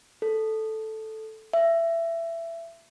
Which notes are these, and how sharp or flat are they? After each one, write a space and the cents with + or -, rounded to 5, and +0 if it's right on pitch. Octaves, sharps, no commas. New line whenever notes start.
A4 -5
E5 +20